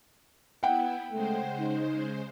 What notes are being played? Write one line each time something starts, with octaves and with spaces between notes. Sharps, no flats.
B3 E4 F#5 G5
C#3 G#3 A3 C5
D#4